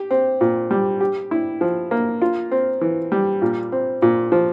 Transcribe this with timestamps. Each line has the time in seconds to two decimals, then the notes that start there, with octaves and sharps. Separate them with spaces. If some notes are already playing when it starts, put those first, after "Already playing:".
Already playing: G4
0.11 C4
0.41 A#2
0.71 G3
1.01 G4
1.31 E4
1.61 F3
1.91 A#3
2.22 F4
2.51 C4
2.81 E3
3.12 G3
3.42 A#2
3.72 C4
4.02 A#2
4.32 F3